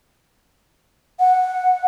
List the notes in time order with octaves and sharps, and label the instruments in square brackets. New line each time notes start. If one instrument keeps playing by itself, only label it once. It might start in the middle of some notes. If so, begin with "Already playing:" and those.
[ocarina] F#5